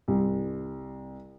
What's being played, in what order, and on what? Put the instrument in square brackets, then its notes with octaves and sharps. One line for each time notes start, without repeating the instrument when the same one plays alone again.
[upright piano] C2